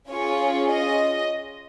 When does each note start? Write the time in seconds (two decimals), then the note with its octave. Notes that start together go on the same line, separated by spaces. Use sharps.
0.10 C#4 F4 G#4 C#5
0.69 D#5